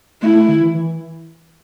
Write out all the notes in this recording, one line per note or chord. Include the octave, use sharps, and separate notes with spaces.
A3 E4
A3
D#3
E3
E3